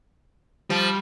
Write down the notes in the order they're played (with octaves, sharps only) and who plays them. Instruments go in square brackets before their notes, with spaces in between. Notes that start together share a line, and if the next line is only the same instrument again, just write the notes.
[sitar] F3 [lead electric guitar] G3